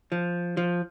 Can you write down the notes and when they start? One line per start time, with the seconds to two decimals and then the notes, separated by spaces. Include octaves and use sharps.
0.12 F3
0.57 F3